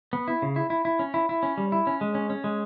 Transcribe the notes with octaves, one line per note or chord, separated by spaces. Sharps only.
B3
E4
C#3
E4
E4
E4
C#4
E4
E4
C#4
G3
E4
C#4
G#3
C#4
C#4
G#3